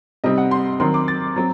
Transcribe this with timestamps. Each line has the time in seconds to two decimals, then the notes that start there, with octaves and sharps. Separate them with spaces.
0.24 C3 G3 C4 D#4 D#5
0.38 F#5
0.51 C6
0.80 D#3 F#3 C4 C6
0.94 D6
1.08 A6
1.36 F#3 C4